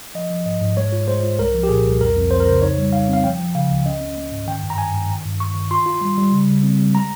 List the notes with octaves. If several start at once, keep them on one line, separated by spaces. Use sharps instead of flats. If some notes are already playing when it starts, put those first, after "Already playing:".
F3 D#5
F3
G#2 D#5
G#2
G#3 C#5
F4
G#3 C5
F4
C2 A#4
F3
G4
A#2 G#4
C2
F2 A#4
F2
F2 C5
A#4
C#3 C5
D#4 C#5
G3
D#4 F5
C4 F5
F3 G5
F3
C#3 F5
C#2
C#4 D#5
C#4
A#3
G#2
D#3 G5
G2
A#5
G2 G#5
G2
D#3
G2
G2 C#6
D#3
F4 C6
F4
G3
G3
C#3
C#3
C4
G3
G#3 A#5